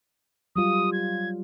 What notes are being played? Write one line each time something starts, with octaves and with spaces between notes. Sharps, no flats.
F#3 G3 F4 D#6
G#6